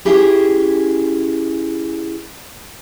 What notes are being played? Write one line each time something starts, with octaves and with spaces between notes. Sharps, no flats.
C#4 E4 G4 G#4 E5 G#5